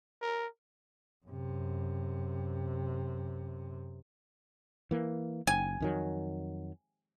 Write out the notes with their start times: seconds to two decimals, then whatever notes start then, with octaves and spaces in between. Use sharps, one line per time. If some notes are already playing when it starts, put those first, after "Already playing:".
0.22 A#4
1.26 F#2 C3
4.91 E3 A#3
5.47 F#1 G#5
5.80 F2 D#3 F#3